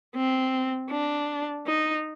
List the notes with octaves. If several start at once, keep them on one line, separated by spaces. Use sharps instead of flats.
C4
D4
D#4